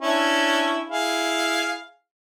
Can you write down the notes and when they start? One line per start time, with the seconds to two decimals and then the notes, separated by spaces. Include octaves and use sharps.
0.01 C#4 D4 E4
0.90 E4 G#4 F5